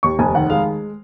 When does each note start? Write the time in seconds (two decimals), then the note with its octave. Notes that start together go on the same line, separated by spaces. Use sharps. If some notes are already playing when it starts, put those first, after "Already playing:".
0.03 D#2 C#6
0.19 F1 G#5
0.34 D#3 F#5
0.50 G#3 F5